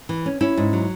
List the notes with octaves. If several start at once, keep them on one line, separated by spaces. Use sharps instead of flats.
E3
C#4
C#4 E4
G#2
F#3